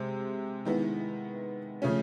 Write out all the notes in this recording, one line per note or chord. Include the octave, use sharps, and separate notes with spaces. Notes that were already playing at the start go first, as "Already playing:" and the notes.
Already playing: C3 G#3 C4
D#3 G#3 B3 E4
C#3 F3 A3 C#4